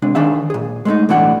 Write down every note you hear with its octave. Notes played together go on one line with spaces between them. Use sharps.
C3 G#3 D4
D#3 D4 G#4 E5 F5
A#2 G#4
G#3 A3 C#4 D#4
B1 A2 E3 D4 F#4 F#5